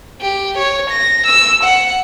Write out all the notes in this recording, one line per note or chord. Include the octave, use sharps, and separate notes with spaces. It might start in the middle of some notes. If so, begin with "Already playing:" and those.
G4
C#5
A#6
E6
F#5